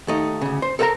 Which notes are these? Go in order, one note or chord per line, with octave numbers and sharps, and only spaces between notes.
D#2 A3 D#4
D2 C#3
C5
A4 A#4 E5 F#5 A5 A#5